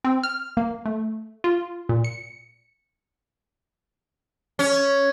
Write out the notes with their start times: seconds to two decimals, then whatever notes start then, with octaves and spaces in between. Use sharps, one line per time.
0.05 C4
0.23 F6
0.57 A#3
0.86 A3
1.44 F4
1.89 A#2
2.04 C#7
4.59 C#4